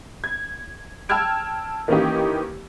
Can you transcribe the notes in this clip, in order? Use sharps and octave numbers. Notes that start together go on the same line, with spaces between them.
G#6
G5 A5 E6 F6 G#6 D7
D#3 E3 A#3 C#4 D#4 G4